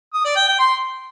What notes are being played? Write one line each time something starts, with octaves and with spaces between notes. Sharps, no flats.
D#6
D5
G5
G5
C6